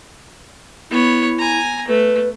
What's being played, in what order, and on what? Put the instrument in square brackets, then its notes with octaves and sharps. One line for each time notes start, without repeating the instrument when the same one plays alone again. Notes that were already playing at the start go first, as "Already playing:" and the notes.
[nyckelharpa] B3 C#5 [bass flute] E4
[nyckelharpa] G#5 A#5
[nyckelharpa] A3 [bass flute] B4